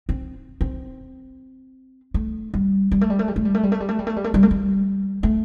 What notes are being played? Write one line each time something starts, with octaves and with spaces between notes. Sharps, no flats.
C4
C4
A3
G3
G3
A3
G3
A3
G3
A3
G3
A3
G3
A3
G3
A3
G3
A3
G3
A3
G3
A3
G3
A3